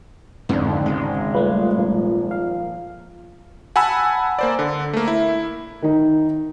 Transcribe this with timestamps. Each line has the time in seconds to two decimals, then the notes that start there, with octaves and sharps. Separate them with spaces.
0.49 F2 G#2 D3 C4 D4
0.86 G#1 D#2 C#3 G#3
1.34 G3 A3 F4 B4
1.77 A#2 F3 A#3
2.31 F5
3.76 F#5 G#5 A5 B5 E6
4.39 A#3 C5 D5
4.59 D3
4.93 A3 A#3
5.08 E4
5.82 D#3 D#4